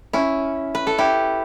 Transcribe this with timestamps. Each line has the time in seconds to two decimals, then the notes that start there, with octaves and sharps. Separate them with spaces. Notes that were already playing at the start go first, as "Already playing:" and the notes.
0.13 C#4 E4
0.75 B4
0.87 A4
0.98 E4 G4